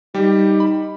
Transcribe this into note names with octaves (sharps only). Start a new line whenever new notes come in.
G3 D#4 G4
B5